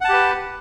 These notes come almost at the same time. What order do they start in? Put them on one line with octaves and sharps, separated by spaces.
F#5 A5 G4 B4